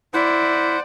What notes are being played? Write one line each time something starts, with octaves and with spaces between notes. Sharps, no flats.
E4 C5 D5 F#5